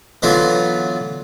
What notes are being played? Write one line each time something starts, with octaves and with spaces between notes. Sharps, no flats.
D3 E3 F#3 B3 F4